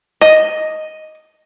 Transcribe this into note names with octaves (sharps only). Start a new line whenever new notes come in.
D#5